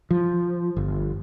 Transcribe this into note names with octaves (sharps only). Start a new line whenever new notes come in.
F3
G1